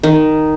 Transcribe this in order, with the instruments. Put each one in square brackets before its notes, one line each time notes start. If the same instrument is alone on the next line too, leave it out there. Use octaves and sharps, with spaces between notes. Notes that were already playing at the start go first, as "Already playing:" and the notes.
[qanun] D#3